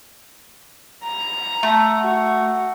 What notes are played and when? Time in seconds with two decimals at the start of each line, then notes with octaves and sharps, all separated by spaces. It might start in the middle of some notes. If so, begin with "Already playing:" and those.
1.03 A#5
1.63 A3
2.00 F#4